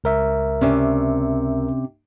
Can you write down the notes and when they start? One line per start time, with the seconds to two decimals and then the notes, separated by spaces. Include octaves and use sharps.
0.04 C#2 A#4 E5
0.61 C3 C#4 D4